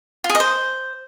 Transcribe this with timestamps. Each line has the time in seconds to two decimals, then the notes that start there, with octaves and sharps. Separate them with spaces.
0.24 F4
0.29 G#4
0.35 D#5
0.40 C5